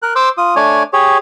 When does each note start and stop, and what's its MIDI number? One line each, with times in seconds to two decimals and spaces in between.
0.03 0.13 70
0.03 0.13 90
0.16 0.29 72
0.16 0.29 84
0.16 0.29 86
0.16 0.29 88
0.38 0.55 65
0.38 0.55 87
0.56 0.83 57
0.56 0.83 62
0.56 0.83 73
0.56 0.83 74
0.56 0.83 80
0.93 1.18 67
0.93 1.18 68
0.93 1.18 73